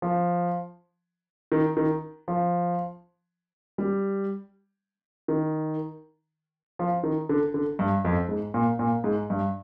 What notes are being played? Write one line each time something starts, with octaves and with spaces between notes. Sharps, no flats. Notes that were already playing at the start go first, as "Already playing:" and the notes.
F3
D#3
D#3
F3
G3
D#3
F3
D#3
D3
D3
G2
F2
G#2
A#2
A#2
G#2
G2